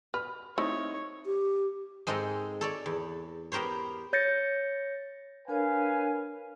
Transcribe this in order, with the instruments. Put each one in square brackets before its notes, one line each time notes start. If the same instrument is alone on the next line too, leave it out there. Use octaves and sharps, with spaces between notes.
[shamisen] B4 [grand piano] F6
[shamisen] A3 [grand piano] C4 D#4 E4 [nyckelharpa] C#5
[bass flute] G4
[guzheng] G#2 G#3 C4 A4 A#4 D#5
A4 C#5 D5
E2
B3 G4 A#4 C5 C#5
[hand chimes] C#5 G6 A6 A#6 C#7
[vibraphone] D4 A#4 C#5 [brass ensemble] B4 F5 G#5